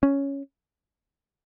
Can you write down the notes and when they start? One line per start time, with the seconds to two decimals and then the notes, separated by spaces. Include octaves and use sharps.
0.03 C#4